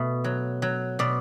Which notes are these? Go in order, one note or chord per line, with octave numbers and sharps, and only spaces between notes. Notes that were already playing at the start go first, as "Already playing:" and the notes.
Already playing: B2 A3
F#3
F#3
B2 D5